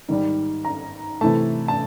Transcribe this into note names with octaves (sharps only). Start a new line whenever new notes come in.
G#2 D#3 G3
A#5
C3 E3 A3 A5
A5